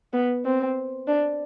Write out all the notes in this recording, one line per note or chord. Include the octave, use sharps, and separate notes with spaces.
B3
C4
D4